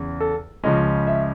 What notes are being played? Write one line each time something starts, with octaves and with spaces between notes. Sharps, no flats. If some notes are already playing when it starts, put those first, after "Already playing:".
Already playing: E2 C#3
A4
C#2 C#3 F3 G#3 C#4 D#5
E5